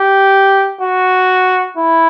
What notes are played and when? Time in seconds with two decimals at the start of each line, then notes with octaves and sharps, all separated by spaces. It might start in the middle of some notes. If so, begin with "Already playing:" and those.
Already playing: G4
0.81 F#4
1.77 E4